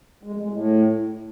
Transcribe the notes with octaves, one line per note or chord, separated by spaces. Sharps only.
G#3
F2
G#3
A2